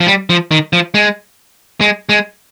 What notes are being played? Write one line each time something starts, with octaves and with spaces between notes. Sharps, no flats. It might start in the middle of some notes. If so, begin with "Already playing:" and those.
F3
G3
F3
D#3
F3
G#3
G#3
G#3